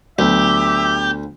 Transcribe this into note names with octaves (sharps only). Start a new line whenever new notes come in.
D2 F#3 B3 G4 E5